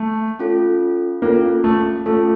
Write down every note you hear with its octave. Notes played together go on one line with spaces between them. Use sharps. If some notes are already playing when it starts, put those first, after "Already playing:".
Already playing: A3
C#4 F4 A4
A#3 C#4 F4 A4
A3
A3 C#4 F4 A4